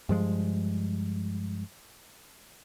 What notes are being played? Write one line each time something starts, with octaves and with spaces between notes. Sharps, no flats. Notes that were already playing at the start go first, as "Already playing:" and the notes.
G2 F3 G#3